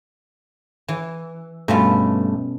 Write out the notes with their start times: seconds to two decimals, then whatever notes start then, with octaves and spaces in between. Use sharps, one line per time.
0.88 E3
1.68 G2 B2 A3 C#4 F4